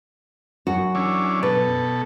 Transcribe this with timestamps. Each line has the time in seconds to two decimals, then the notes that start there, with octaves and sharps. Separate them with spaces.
0.67 F#2 F#4
0.95 E3 C#4 D4
1.43 B2 A4 B4